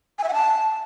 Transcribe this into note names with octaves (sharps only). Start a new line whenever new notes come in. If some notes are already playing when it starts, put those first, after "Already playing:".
G#5
E5
F#5
A5